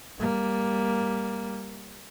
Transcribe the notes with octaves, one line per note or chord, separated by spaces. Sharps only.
G3 A#3